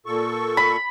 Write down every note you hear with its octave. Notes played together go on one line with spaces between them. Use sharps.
A#2 A4 C#6
B5